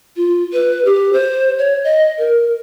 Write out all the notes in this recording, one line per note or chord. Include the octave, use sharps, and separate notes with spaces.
F4
B4
G4
C5
C#5
D#5
A#4